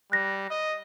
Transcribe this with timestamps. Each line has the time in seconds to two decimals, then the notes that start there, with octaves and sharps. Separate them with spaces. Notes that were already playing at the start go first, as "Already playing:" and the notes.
0.12 G3 F#6 A#6
0.50 D#5